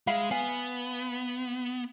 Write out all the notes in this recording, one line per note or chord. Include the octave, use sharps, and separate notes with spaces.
G#3 E5 F5 B5
B3 F5 G#5